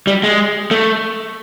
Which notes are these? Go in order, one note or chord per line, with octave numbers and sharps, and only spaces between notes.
G3
G#3
A3